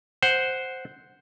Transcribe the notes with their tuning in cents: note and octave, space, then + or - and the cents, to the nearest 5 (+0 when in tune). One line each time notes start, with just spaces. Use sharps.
C5 +0 F#5 +0